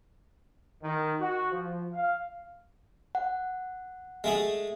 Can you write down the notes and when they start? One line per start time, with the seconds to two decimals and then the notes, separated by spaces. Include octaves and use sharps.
0.83 D#3
1.20 F#4
1.52 F3
1.94 F5
3.15 F#5
4.24 G#3 A3 G#4